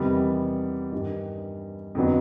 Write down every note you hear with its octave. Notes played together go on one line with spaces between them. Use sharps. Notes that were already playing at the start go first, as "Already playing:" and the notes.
Already playing: E2 C3 D#3 G3 B3
G2 D#3 G3
F2 D3 F#3 B3 D#4